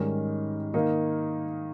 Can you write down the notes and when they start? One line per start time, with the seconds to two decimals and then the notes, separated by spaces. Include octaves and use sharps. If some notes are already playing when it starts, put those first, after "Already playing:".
Already playing: G#2 D#3 G3 C#4
0.74 D#3 A#3 D#4